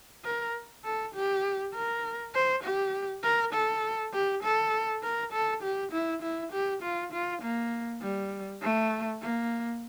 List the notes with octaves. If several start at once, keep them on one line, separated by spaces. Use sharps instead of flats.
A#4
A4
G4
A#4
C5
G4
A#4
A4
G4
A4
A#4
A4
G4
E4
E4
G4
F4
F4
A#3
G3
A3
A#3